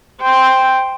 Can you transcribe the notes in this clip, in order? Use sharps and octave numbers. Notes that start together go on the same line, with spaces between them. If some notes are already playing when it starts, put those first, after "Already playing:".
C5 G5